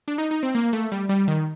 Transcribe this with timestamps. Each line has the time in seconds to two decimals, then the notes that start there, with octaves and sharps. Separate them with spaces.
0.08 D4
0.18 D#4
0.31 D#4
0.43 C4
0.55 A#3
0.73 A3
0.92 G3
1.09 G3
1.28 D#3